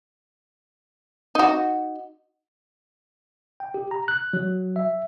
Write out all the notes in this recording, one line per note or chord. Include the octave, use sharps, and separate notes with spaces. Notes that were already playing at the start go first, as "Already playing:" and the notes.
D#4 F#4
G5
G4
A#5
F#6
F#3
E5